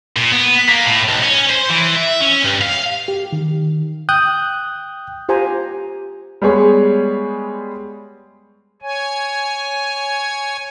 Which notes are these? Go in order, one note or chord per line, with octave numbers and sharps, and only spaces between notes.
A#2
B3
A#3
A2
B1
C#4
C5
E3
E5
C#4
G2
F5
G4
D#3
G5 D#6 F#6 G6
F4 G4 C5 G5 G#5 A#5
G3 G#3 B3 G#4 C#5
C#5 G#5